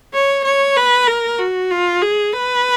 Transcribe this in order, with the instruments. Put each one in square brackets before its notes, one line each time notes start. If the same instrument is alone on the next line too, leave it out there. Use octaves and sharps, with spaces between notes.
[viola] C#5
C#5
B4
A#4
F#4
F4
G#4
B4